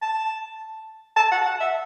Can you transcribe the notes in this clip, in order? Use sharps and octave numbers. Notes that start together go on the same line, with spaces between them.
A5
A5
F#5
F#5
E5